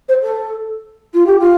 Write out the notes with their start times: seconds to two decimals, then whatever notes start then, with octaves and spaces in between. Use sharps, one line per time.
0.08 C5
0.22 A4
1.14 F4
1.26 G4
1.39 F4